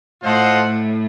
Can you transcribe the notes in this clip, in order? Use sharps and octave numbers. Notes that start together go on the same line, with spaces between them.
A2 F4 A4 C5 D#5 F#5